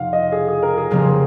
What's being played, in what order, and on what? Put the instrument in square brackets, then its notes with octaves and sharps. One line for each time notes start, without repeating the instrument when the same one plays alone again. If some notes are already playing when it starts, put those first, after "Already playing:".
Already playing: [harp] F2 C3 F3 D#4 [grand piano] F5 F#5
[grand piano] D#5
G#4
G#4
A#4
G#4
[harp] F1 F2 C#3 F3 A#3